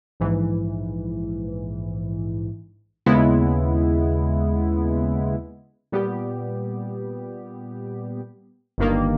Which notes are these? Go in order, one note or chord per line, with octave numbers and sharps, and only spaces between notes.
A#1 G#2 E3
D#2 C#3 G#3 B3 E4
A#2 G3 B3 G4
G1 G2 D#3 A#3